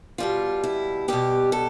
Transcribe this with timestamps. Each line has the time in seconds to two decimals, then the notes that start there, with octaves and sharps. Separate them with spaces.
0.18 B2 G3 B3 F4
0.64 E4
1.08 B2 G3 B3 G4
1.52 A4